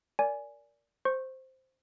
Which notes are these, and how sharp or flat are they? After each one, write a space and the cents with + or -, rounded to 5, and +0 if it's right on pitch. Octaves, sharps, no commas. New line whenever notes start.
A#4 +0 D5 -15 G#5 +0
C5 +0 C#6 -25